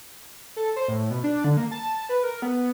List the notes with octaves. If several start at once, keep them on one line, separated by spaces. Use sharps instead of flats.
A4
C5
A2
B2
D4
D3
A#3
A5
B4
A#4
B3